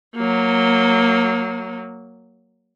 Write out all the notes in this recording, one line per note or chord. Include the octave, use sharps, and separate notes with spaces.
F#3 A#3